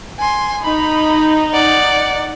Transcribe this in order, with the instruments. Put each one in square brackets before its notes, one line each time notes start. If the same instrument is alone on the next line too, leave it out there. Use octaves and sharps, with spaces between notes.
[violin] G#5 C6
[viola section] D#4 [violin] B5
[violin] D5 F#5